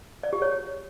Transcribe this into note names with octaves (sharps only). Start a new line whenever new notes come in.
D5
G4
C#5